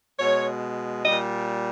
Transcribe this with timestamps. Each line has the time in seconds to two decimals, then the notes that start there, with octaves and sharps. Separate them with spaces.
0.19 B2 G#3 C#5
1.05 G3 D#5
1.10 A#2